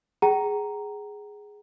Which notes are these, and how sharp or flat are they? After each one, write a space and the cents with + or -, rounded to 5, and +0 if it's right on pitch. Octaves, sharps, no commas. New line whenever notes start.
G#4 +0 F#5 +45 A#5 +0